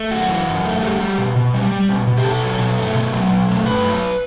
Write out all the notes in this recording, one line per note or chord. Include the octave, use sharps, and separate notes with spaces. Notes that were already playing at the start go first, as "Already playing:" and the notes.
Already playing: A3
F#2 F#4
E3
F#2
A3
G3
G3
B2
B2
G3
G3
B2
B2
G4
B2 A4
F#3
B2
A3
B2
F#3
B2
A3
G2 B4
F#3